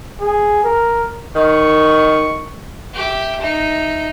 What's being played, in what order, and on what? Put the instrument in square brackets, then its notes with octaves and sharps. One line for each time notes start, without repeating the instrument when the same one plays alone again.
[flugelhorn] G#4
A#4
[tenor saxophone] D#3 [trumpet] C#6
[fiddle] G4 E5
D#4 E5